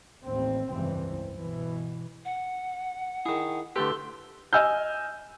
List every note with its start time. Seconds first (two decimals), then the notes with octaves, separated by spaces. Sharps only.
0.23 A1 D#2 C4
0.69 F1 C#2 G2 E3 C4
1.36 B2 E3
2.25 F#5
3.26 D#3 E4 G#4
3.76 D3 A3 G4 A4 B4 C6
4.53 D#5 G#5 E6 F6 G6